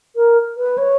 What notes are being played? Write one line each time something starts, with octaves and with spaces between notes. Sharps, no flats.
A#4
B4
C#5